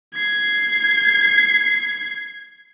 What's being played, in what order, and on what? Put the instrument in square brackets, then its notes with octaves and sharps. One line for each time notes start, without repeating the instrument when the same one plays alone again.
[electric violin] G#6 C7